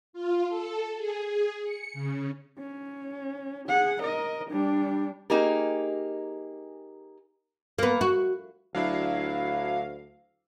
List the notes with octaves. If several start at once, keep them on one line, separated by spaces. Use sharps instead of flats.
F4
A4
G#4
G#4
C#7
C#3
C#4
G#4 F#5
A#4 D#5
G3 D4
A#3 D#4 G4 G#4 A#4
A#3 B3
F#4
D2 F#3 D4 E4 F5